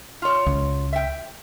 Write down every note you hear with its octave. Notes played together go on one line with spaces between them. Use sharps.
F4 C#5
C#2
E5 G5